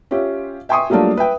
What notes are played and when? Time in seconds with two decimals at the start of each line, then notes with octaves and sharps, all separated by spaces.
0.11 C#4 F4 G4 E5
0.69 E5 G5 G#5 C6 C#6 D#6
0.90 F#3 G3 A3 A#3 D4 F4
1.17 B4 E5 G5